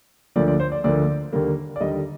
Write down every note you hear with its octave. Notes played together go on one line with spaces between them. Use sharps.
D2 D3 F3 A#3 D5
D5
C5
D5
D2 D3 F3 A#3 D5
D#2 D3 G3 A#3
D5
D#2 D3 G3 A#3 D#5